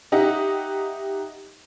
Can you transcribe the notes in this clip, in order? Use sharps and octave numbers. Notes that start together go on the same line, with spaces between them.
D#4 G4 D#5 E5 F#5